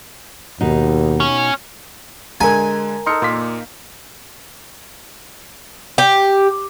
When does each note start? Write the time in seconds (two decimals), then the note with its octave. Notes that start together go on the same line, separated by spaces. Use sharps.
0.61 D#2 B2 D#4
1.20 C#4
2.41 D3 G#3 A#4 G#5 A#5
3.06 D#4 A4 C6 F6 C#7
3.22 A#2 A#3 C6 B6
5.98 G4